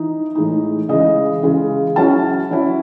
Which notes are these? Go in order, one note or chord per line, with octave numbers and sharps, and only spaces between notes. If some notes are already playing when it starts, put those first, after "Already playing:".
Already playing: E3 D#4
A2 E3 G#3 D#4
C#3 E3 G#3 D#5
C#3 E3 G#3
F#3 C#4 E4 A5
F#3 C#4 E4